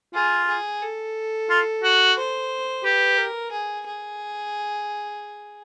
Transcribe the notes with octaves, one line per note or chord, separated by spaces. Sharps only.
F4 G#4
G#4
A4
F4
F#4
C5
G4 B4
A#4
G#4
G#4